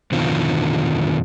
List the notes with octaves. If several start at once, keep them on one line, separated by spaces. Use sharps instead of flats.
F2 B2 D3 D#3 F3